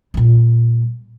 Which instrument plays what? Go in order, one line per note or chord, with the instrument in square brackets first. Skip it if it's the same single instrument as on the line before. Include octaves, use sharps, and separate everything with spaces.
[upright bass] A#2 G3